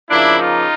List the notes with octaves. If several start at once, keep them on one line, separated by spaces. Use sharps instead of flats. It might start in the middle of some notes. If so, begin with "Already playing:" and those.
C#3 F3 A#3 D4 E4
D#4 F4